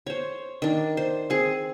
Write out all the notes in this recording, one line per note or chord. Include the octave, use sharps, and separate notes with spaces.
C5 C#5
D#3 D4
C5
C4 G#4